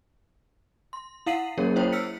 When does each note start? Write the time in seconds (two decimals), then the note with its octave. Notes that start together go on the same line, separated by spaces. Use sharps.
0.93 C6
1.26 E4 F5 F#5 C7 D#7 F#7
1.58 F#3 A#3 C#4 G#4 A#4 C#5
1.76 E4 C5 C#5 G5
1.92 E6 F6 B6 C#7